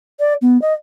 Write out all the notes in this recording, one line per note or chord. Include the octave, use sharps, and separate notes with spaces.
D5
B3
D#5